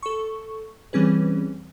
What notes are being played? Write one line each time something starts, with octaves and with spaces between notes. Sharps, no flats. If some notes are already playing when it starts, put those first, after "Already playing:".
A4 C#6
E3 G3 C4 C#4 G#4 B4